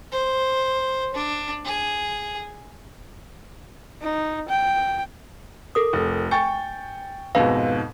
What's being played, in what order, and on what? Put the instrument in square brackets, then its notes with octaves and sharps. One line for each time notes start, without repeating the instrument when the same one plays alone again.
[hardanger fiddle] C5
D4
G#4
[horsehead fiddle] D#4
G5
[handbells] A4 A#4 D#6
[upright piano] F1
[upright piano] G5 C#6 A6 [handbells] G#5
[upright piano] F2 G#2 B2 [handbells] B4 F5